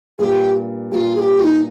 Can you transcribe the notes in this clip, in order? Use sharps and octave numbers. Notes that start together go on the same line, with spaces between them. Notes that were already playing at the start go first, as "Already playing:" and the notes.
G2 A#2 G4 G#4
G2 A#2 F4 G4
G#4
G4
F4
D#4